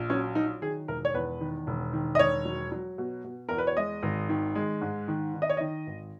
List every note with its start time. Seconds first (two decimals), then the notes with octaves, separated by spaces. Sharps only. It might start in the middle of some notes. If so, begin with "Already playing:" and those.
Already playing: A#1
0.10 F#3 C#4
0.35 F#3 D#4
0.62 D#3 G#4
0.88 E1 A#4
1.05 C#5
1.14 E2 B4
1.41 D#3
1.67 E1
1.93 D#3
2.15 D#5
2.19 E1 C#5
2.45 F#3
2.72 F#3
2.98 B2
3.24 B2
3.49 E2 A#4
3.58 B4
3.67 C#5
3.77 G#3 D#5
4.03 G#1
4.29 D#3
4.55 G#3
4.81 G#2
5.08 D#3
5.34 D#3
5.42 D#5
5.50 C#5
5.57 D#3 D#5
5.87 G#1